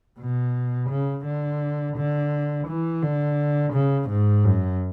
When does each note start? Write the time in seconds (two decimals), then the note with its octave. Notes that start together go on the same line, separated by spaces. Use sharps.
0.19 B2
0.89 C#3
1.25 D3
1.97 D3
2.68 E3
3.02 D3
3.73 C#3
4.09 G#2
4.44 F#2